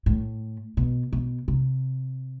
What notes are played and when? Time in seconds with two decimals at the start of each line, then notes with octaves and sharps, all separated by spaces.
0.06 A2
0.77 B2
1.13 B2
1.48 C3